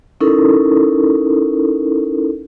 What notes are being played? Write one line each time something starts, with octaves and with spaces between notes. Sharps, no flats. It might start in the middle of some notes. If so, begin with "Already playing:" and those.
C#4 D#4 E4 A4 A#4